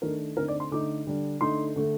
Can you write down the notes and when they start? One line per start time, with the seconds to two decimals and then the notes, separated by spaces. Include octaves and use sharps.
0.02 D#3 A3 D4 A#4
0.36 D3 A3 C4 D#4 A#4
0.48 D5
0.60 C6
0.71 D3 A3 D#4 D6
1.07 D3 G3 D4
1.41 D3 A3 D#4 C6
1.76 D3 A3 D4